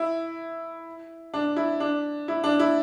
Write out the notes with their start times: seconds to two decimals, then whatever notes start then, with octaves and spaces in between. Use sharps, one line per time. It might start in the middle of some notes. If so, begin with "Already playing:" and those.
Already playing: E4
1.34 D4
1.56 E4
1.80 D4
2.28 E4
2.44 D4
2.60 E4